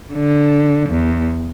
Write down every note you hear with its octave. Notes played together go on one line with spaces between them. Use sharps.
D3
E2